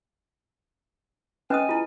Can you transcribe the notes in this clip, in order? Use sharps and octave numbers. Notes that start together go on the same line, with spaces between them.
C#4 B4 D#5 G5 G#5 D#6 F#6
E4 F4